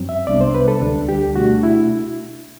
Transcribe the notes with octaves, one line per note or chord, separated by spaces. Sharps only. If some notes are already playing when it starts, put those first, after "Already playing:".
Already playing: F#2 F#3 C4
E5
C2 C3 G3 B3 D4 D5
C5
B4
A4
D2 D3 G3 D4
G4
B2 A3 D4 F#4
E4